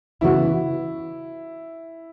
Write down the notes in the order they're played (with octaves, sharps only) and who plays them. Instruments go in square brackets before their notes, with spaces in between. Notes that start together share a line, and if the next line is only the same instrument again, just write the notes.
[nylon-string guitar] C#3 E3 B3 F#4 [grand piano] E4